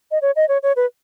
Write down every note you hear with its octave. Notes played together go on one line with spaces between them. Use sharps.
D#5
C#5
D#5
C#5
C#5
B4